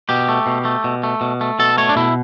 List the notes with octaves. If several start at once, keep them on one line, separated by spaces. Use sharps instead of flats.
B2 G4
A3
B2
A3
B2
A3
B2
A3
B2 A4
A3 C#5
D4
B2 E4